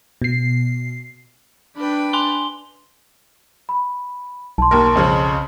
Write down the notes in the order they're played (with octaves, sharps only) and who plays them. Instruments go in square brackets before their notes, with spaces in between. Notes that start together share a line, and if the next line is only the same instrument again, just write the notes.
[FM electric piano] B2 C7
[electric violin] D4 B5 [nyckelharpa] B4 G5
[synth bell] G#5 C6 G7
[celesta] B5
[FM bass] B1 [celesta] A5 C6
[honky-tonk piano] D#2 A#4
F2 C#3 F3